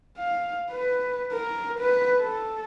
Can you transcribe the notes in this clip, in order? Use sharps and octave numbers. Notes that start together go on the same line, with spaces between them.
F5
B4
A#4
B4
A4